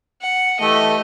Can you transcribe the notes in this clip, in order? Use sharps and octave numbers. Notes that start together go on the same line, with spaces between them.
F#5
E3 A3 G4 D#5